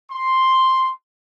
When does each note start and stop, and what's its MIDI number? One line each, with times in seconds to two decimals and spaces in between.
0.11 0.90 84